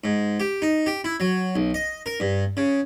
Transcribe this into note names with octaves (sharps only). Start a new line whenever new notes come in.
G#2
G4
D#4
G4
E4
F#3
B1
D#5
A#4
G2
C#3